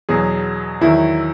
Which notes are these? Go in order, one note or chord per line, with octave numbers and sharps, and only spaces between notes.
E2 B2 F#3 G#4
E2 D#3 F#3 E4